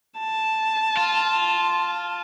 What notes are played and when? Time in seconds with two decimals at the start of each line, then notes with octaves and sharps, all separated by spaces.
0.19 A5
0.97 F4